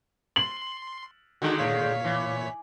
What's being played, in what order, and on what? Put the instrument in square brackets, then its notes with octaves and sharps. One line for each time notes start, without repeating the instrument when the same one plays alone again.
[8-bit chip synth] C6 [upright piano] F#7
[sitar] D3 D#3 G#3 [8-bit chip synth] D#4 F#4
[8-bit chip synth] A#2 C#5 B6 [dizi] F5
[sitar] E3